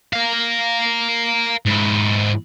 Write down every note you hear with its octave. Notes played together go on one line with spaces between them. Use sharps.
A#4 F5
G#2 E4